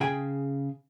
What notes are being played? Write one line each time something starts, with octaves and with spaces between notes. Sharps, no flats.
C#3 G#4 G5 G#5